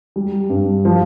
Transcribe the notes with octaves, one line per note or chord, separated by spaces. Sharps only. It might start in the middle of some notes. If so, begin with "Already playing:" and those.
G3
G2
F3